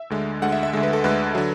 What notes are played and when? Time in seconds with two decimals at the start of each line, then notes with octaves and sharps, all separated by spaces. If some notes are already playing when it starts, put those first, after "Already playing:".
Already playing: E5
0.10 D2 D3 G#3
0.42 D2 D3 G#3 F#5
0.52 E5
0.63 E5
0.73 D2 D3 G#3
0.83 B4
0.93 A4
1.04 D2 D3 G#3 B4
1.35 D3 F#3